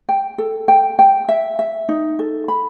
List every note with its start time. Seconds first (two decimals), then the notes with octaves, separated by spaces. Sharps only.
0.09 G5
0.38 A4
0.68 G5
0.99 G5
1.29 E5
1.59 E5
1.89 D#4
2.19 A4
2.48 B5